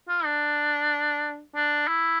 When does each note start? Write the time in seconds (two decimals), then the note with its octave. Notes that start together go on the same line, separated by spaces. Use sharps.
0.09 F4
0.25 D4
1.55 D4
1.88 E4